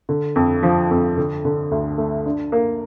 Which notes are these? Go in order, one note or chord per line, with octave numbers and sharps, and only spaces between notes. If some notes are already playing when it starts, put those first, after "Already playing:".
D3
F2
F3
F2
D3
D3
D2
A3
D4
A#3